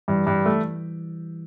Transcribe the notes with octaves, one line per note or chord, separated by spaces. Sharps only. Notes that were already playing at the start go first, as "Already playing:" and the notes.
G2 E3 G3
G2
A3